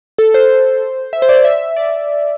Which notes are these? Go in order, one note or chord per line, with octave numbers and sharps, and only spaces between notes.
A4
C5
E5
C5
D5
E5
D5